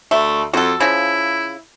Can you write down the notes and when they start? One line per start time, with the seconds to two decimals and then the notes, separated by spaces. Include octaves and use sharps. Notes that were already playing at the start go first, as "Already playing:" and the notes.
0.11 D2 A3
0.53 F2 F#4 A4
0.80 C#3 F3 E4